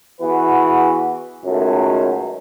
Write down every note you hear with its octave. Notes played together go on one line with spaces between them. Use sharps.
E3 B3 F#4 G#4 B4
C#2 F#2 D#3 A3